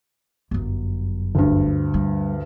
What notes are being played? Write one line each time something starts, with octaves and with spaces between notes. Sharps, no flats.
G1 F#2
D2 G2
G3